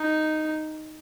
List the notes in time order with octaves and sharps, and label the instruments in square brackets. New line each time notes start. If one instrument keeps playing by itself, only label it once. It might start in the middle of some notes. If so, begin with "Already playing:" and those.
Already playing: [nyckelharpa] D#4